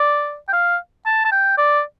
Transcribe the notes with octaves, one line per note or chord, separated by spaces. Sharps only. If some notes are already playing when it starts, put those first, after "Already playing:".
Already playing: D5
G5
F5
A5
A5
G5
D5